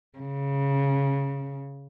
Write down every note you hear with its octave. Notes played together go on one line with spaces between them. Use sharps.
C#3